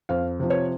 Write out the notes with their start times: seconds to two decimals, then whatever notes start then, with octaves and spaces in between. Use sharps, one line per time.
0.09 F2 F5
0.40 C3 F3
0.50 C#5